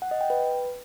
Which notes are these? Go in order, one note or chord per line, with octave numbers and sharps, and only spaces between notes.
F#5
D#5
G5
B4